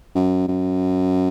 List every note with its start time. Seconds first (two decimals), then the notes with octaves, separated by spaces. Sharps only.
0.15 F#2
0.48 F#2